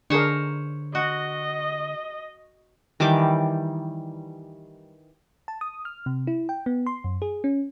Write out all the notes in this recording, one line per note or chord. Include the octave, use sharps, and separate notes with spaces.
D3 D4 G#4 A#4 C5 C#5
F#4 D#5
D#3 E3 G3 D6
A5
D#6
F6
C3
E4
G5
B3
C6
F#2
G#4
C#4